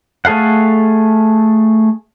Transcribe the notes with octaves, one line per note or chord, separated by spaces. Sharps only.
A3 G#4 A4 F5 F#5